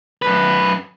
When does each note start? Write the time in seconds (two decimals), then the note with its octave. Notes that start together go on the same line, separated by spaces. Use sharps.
0.22 F#2 B4